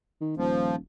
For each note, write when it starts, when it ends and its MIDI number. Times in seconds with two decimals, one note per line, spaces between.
0.21 0.34 51
0.37 0.76 27
0.37 0.76 53